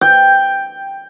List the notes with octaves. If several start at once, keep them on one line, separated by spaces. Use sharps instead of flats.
G5